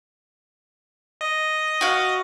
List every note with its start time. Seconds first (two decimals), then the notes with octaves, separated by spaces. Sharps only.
1.21 D#5
1.81 F#4 F5